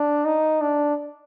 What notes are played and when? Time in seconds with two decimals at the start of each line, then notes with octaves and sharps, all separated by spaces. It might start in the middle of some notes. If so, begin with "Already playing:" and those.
Already playing: D4
0.25 D#4
0.61 D4